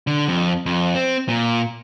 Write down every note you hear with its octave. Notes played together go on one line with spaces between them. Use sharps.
D3
F2
F2
C4
A#2